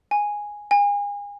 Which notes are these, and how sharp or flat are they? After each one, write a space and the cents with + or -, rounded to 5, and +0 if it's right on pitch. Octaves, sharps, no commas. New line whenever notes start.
G#5 -5
G#5 -35